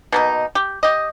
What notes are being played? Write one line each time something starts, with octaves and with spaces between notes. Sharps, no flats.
B2 A#3 D#4
G4
G4 D#5